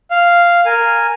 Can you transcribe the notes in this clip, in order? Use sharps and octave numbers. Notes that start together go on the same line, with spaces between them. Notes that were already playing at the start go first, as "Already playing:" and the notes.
F5
A#4 G#5